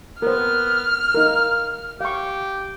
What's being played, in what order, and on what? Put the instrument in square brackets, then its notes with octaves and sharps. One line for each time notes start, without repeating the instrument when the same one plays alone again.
[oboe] B3 [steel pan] A#4 C5 [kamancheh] F6
[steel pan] D#4 A#4 [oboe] F5
[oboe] G4 [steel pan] F5 C#6